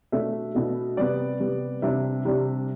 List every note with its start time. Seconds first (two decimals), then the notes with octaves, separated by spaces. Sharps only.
0.12 B2 A3 D4 E5
0.55 B2 A3 D4
0.97 C3 G3 B3 D5
1.40 C3 G3 B3
1.82 C3 G3 D4 E5
2.25 C3 G3 D4